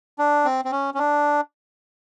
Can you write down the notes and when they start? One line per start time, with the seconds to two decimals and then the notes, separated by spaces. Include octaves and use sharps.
0.19 D4
0.45 C4
0.65 C4
0.71 C#4
0.94 C#4
0.99 D4